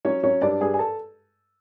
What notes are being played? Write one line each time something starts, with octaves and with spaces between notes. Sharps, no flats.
F#3 C#4 C#5
F#3 C#4 C#5
G2 D4 D5
G2 G#4 G#5
G#5
A4 A5